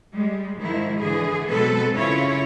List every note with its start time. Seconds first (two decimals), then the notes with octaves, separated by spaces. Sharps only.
0.14 G3 G#3
0.60 G#2 D#3 F3 E4
0.99 D3 E3 G#4
1.49 B2 F#3 G#3 C4 A4 B4
1.93 C#3 C#4 E4 F4 C#5